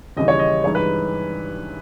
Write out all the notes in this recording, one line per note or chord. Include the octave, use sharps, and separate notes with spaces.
D#2 C#3 E3 G3 D#5
C#5
D#5
G2 E3 G#3 D#4 C#5
B4